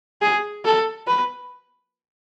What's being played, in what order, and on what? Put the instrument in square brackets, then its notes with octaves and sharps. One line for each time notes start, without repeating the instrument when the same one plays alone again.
[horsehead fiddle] G#4
A4
B4